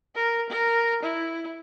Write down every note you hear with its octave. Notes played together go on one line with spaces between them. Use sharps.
A#4
A#4
E4